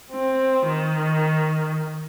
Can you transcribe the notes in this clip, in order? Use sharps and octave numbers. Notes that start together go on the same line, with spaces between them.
C4
D#3